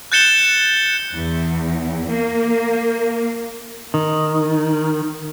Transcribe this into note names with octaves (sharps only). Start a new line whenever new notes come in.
F#6 G6 A6 C#7 E7 G7
E2
A#3
D#3